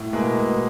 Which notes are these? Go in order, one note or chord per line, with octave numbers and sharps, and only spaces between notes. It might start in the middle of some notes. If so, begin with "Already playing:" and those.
Already playing: A2
B2 G#3 A#3
B2